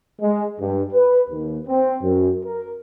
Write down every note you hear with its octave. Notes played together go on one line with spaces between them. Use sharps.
G#3
G2
B4
D#2
C4
F#2
A#4